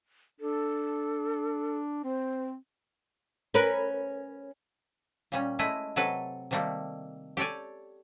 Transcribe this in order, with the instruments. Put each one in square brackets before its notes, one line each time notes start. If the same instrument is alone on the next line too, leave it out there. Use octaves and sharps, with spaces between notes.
[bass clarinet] D4 [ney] A4
[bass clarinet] C4 [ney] C5
[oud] C#4 A#4 B4
[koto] A#2 G3 C#4
G#3 A3 E4 D#5
C3 F#3 A4 B4
C3 D#3 G3 A3 A#3
G4 A4 C#5 D5 G#5